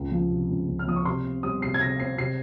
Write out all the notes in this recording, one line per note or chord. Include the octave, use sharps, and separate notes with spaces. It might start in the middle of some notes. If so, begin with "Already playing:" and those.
Already playing: C#2
F3
C3
C#2
C#2
F6
F3 D#6
C#6
C3 C6
C4
G3 D#6
C3 C7
G#6
C3 A#6
C4 C7
C3 C7